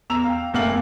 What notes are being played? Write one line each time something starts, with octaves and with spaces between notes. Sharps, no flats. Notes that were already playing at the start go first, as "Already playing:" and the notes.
E2 A#5 E6 F7
F5 G5
F#1 A3 A#3 F5 F#5 F#7
F#1 E2